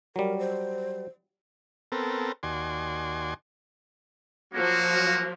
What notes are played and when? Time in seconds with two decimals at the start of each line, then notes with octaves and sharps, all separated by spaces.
0.16 F#3 G3 A#4
0.38 C5
1.92 B3 C4 A4 A#4
2.43 D#2 F#4 D5 G#5 C6
4.53 F3 F#3 A#3 F#4